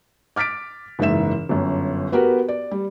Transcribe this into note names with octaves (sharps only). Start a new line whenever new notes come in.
D6 F6 A6 B6 D7
F#1 G#2 E3 E5 E7
G1 F#2
B3 F#4 G4 A#4 B4
D5
G3